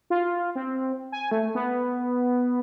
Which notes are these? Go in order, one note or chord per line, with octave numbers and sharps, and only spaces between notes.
F4
C4
G#5
A3
B3